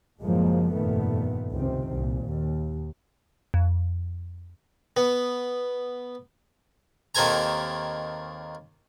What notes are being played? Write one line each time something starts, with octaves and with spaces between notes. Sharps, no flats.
F#1 A2 F3 F#3 G#3 A#3
G1 F2 A#2 D#3 A3 B3
C#2 C3 D#3 C4
C2 A#2
D#2
F2
B3
D#2 D#3 C4 A4 G#5 A#5